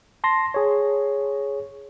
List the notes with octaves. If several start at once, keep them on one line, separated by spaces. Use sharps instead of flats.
A5 C6 A#6
G#4 C#5